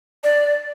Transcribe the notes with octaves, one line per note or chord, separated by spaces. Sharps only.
D5